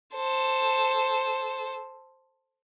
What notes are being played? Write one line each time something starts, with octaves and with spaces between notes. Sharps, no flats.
A4 C5